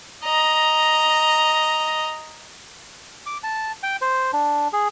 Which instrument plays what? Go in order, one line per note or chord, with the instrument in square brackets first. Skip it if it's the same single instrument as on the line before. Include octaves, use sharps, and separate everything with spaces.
[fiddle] D#5 A#5
[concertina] D6
A5
G5
C5
D4
G#4